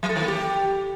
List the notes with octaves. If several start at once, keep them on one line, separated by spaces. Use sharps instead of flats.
F#3
A4
D#3
A#3
G4